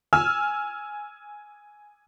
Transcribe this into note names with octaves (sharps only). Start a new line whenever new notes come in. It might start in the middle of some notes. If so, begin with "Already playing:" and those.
G#5 E6 F6